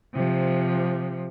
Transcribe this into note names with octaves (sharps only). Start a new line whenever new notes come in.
C3 F3